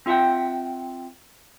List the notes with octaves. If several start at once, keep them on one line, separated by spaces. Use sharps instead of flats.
C4 F4 E5 F#5 G5